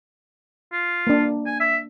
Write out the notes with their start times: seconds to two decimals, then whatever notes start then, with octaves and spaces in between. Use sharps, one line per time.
0.72 F4
1.07 A#3 D4
1.47 G#5
1.60 E5